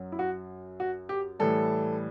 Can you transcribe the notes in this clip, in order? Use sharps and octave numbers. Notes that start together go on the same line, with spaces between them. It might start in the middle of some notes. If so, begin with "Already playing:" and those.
Already playing: F#2 F#3
E4
F#4
F#4
G4
A2 E3 G3 A4